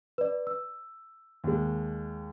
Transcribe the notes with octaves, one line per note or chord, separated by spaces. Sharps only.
B4 D5
E6
D#2 G#3